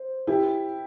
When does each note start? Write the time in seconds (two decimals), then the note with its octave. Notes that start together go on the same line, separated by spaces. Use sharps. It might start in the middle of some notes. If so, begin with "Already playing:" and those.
Already playing: C5
0.27 E4 G4